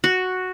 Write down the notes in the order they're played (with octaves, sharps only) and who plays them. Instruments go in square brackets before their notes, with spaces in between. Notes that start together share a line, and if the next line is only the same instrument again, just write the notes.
[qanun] F#4